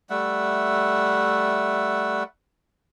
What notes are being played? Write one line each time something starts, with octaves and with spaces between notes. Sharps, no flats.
G3 A3 E5 F#5